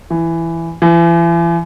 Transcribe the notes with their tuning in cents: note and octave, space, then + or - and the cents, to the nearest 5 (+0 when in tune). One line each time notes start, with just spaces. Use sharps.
E3 +10
E3 +40